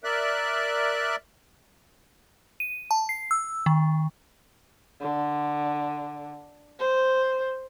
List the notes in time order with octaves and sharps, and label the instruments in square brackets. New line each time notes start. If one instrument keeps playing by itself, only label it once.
[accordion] A#4 D5 E5 F#6
[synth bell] D#7
A5
C7
E6
D#3
[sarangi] D3
C5